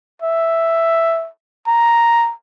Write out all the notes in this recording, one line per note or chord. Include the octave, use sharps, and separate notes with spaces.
E5
A#5